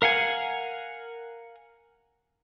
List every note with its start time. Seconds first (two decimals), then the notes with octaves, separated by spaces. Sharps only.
0.02 A#4 F5 F#5 G#5